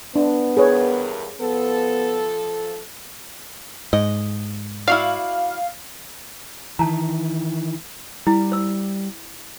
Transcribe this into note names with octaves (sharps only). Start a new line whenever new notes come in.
B3 D4
E2 G2 G#4 A#4 B4 C#5
F3 B3 A4
G#2 D#5
E4 F#4 D5 F5
D#3 E3 A5 A#5
G3 E4
C5 E6